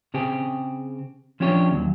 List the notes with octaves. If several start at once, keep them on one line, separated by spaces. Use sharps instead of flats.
C#3 C4 G4 G#4
F3 C#4 D4 G4 C#5
D#2 F#3